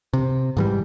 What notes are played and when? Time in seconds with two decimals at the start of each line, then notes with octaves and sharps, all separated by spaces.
0.13 C3
0.57 G#2 E3 G3